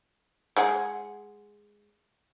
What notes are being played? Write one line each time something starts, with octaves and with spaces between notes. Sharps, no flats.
G#3 G#4 F#5